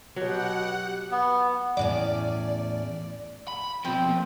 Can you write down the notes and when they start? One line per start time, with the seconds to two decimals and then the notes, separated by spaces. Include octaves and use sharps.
0.16 B2 F#3 G4 F#5
1.11 B3
1.77 E2 A2 C#4 D5
3.48 B5
3.85 B2 F3 C4
4.09 A#2